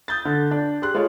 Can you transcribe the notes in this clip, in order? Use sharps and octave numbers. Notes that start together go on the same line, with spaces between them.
D#6 G6 A6
D3
D4
G4 G#4 C6 F#6
G#3 F4 G#4 A4 C#5